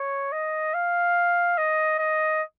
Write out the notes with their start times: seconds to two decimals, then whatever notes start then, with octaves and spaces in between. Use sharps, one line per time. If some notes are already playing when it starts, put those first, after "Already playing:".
Already playing: C#5
0.32 D#5
0.74 F5
1.58 D#5
1.99 D#5